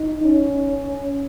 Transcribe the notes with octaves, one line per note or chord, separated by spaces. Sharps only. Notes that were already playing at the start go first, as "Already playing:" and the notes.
Already playing: D#4
C#4